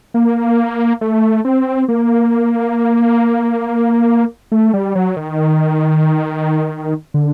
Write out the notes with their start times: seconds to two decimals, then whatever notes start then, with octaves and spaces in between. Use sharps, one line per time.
0.14 A#3
1.01 A3
1.45 C4
1.89 A#3
4.52 A3
4.74 G3
4.95 F#3
5.17 D#3
7.14 D3